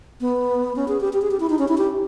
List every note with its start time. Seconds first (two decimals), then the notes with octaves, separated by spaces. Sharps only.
0.21 B3
0.76 C#4
0.88 G#4
1.00 G4
1.13 G4
1.22 G#4
1.31 G4
1.40 E4
1.49 D#4
1.59 C#4
1.68 E4
1.78 G4